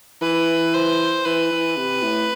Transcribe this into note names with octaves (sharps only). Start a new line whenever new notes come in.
E3 B4
C5
E3 B4
E3
C3
A2